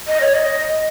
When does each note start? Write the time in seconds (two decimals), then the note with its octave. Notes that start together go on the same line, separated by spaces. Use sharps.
0.08 D#5
0.21 C#5
0.34 D#5